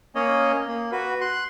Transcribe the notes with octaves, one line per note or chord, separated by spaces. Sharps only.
A#3 C#4 C#5 D#5
A#3
F#4 B4
C6 F#6